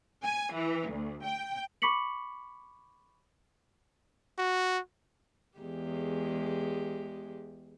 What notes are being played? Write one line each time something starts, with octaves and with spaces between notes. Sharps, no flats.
G#5
E3
D2
G5
B5 C#6 D6 B6 C#7 F#7
F#4
E2 G#3 G4